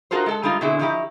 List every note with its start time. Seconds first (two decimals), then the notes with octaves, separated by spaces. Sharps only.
0.11 D#4 F4 F#4 A4 A#4 C5
0.26 G#3 A4 A5
0.43 G3 G#3 D#4 F4
0.61 B2 D3 C4 E4 G#4
0.79 D#3 F3 D#4 E4 G4